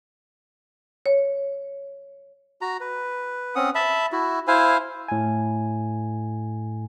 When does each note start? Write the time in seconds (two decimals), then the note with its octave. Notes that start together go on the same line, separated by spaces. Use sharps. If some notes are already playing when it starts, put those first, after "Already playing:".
1.06 C#5
2.61 F#4 A#5
2.80 B4
3.56 C4 C#4 F#5 D#6
3.75 E5 A5 B5
4.12 E4 F#4
4.47 E4 C5 F5 G#5
5.08 A2 G#5